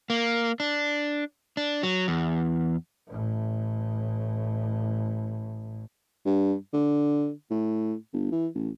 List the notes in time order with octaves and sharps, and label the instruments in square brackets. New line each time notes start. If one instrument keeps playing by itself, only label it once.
[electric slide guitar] A#3
D4
D4
F#3
E2
[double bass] A1 A2
[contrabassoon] G2
D3
A2
G1
E3
A1